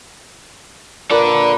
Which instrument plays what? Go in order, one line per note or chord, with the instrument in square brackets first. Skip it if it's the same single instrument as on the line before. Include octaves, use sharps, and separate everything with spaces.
[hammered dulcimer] A#2 A#3 B4 [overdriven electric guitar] A4 D5